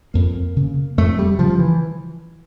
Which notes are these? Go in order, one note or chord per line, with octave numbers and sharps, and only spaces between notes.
F2 A#3
C#3
F2 A3
G3
C#3 F3
E3